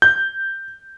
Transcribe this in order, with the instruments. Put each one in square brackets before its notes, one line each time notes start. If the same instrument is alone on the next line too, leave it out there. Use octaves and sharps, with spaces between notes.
[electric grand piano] G6